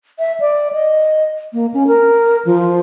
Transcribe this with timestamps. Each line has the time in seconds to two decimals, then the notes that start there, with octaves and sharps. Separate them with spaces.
0.19 E5
0.40 D5
0.73 D#5
1.53 A#3
1.74 C#4
1.87 A#4
2.45 F3